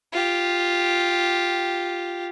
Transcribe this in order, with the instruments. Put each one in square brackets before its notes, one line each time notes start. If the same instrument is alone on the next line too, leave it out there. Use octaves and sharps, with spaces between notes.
[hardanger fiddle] F4 G4